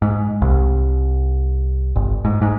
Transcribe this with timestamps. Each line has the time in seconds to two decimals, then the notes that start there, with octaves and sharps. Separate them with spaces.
0.02 G#2
0.42 C2
1.96 G1
2.25 G#2
2.42 G#2